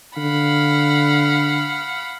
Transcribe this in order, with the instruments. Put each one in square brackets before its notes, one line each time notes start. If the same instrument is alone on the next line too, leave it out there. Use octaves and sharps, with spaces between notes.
[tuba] D3 [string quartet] F5 F#5 B5